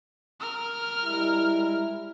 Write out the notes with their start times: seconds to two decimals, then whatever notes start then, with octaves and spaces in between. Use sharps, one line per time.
0.40 A#4 F6
1.05 G3 G#3 E4